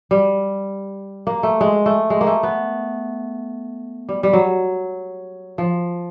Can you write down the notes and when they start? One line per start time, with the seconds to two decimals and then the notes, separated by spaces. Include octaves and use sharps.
0.11 G3
1.27 A#3
1.43 A3
1.61 G#3
1.86 A3
2.10 G#3
2.21 A#3
2.27 A3
2.43 B3
4.09 G3
4.23 G3
4.33 F#3
5.58 F3